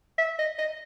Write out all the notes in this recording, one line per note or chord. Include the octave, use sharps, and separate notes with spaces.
E5
D#5
D#5